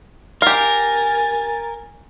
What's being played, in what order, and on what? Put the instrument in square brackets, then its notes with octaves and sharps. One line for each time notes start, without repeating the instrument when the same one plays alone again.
[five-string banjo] G4 F5 [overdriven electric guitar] A#4 [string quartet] G#5 A6